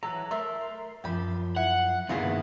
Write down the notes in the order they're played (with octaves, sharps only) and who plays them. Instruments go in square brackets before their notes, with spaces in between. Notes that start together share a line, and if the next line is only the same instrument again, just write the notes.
[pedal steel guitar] E3 F#3 A#5 [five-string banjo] A4
[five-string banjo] A3 E5 [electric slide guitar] A#4 [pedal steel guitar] C6
[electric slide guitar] F#2 F3 [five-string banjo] G4 B5
[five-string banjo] E4 [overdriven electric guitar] F#5
[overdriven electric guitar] B1 G2 [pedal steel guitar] D#3 A#3 E4 [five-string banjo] B3 F4 G#4